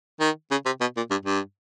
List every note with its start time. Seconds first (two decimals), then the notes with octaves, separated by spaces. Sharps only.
0.20 D#3
0.51 C#3
0.66 C3
0.81 B2
0.97 A#2
1.11 G2
1.26 G2